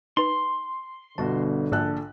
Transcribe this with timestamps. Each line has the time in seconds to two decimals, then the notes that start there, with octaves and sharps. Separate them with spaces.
0.17 D#4 B4 C6
1.18 G1 B2 D3 F#4 A5
1.72 A#1 G#2 A4 F#6